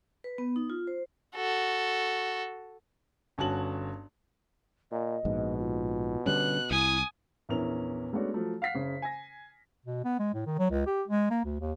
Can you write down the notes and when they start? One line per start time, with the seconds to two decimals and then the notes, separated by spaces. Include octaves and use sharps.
0.24 B4
0.38 B3
0.56 D#4
0.70 F4
0.87 C5
1.36 F#4 A4
3.38 G1 C#4 F#4 A5 F#7
4.91 A#2 D#5
5.25 A#1 G#2 B2
5.59 F4
6.26 D3 G3 C#4 B4 F#6
6.71 C2 E4 G#5 D#6
7.49 A#1 E2 C#4 E4 A#4 F7
8.13 G#3 A3 B3 C#4 D4 F#4
8.34 F3 F#3 A3
8.62 F5 F#5 B6 C7
8.74 F#1 C#3
9.02 G#5 A#6
9.86 B2
10.05 B3
10.19 G#3
10.34 A2
10.46 D#3
10.59 F#3
10.71 C#2
10.86 G4
11.08 G#3
11.30 A#3
11.45 D2
11.60 D#2